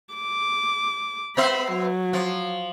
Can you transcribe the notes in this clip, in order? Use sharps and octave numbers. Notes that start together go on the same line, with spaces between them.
D6
B3 C5 E5 B5
F#3
F3